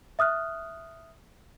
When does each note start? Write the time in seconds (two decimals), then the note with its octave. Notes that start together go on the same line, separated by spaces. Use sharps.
0.19 E5 D#6 F6 F#6